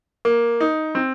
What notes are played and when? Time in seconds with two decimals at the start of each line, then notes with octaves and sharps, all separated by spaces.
0.25 A#3
0.60 D#4
0.95 C4